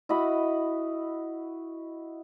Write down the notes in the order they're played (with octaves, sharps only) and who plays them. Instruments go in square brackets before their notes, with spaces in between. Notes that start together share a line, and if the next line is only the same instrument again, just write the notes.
[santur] E4 F#4 D#5 B5